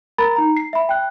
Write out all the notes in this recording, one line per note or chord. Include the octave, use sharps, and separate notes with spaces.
A#4 A#5 B5 A6
D#4 A#5
C7
E5 B5
G5 F#6